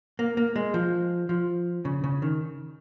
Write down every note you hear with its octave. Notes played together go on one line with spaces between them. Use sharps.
A#3
A#3
G#3
F3
F3
C#3
C#3
D#3